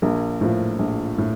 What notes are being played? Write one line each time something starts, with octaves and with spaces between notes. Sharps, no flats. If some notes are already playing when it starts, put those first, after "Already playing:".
A#1 A#3
A2 F3
A#1
A2